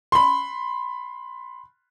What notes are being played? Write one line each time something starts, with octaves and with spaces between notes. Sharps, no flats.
B5 C6